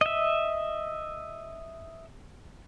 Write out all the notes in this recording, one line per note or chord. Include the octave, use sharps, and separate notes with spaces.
D#5 E5